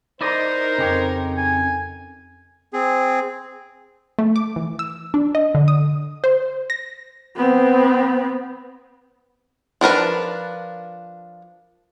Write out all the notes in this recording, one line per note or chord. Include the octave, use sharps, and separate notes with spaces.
D#4 E4 A#4 C5 D5 D#5
F2 C#3 G4 C#5
G#5
C4 G#4
A3
D6
E3
E6
D4
D#5
D3
D#6
C5
A#6
B3 C4
F3 D4 A#4 B4